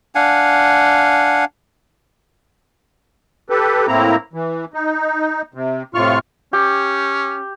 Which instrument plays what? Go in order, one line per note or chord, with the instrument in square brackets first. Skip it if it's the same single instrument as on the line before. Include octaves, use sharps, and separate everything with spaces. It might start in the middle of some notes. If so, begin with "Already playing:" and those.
[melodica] D4 F5 F#5 G#5
[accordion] G4 A4 B4
A2 A#3 C4 E4 A#5
E3
D#4
C3
A2 C3 F4 C#6 F6
[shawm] C#4 [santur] G4